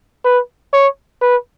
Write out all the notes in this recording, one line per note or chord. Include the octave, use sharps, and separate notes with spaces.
B4
C#5
B4